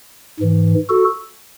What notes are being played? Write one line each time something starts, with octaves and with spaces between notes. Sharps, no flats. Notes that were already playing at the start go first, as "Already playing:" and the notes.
G#2 E3
F#4 A4